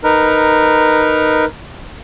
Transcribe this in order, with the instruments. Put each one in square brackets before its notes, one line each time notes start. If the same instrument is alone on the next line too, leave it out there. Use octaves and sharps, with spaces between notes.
[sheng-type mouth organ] D#4 A#4 B4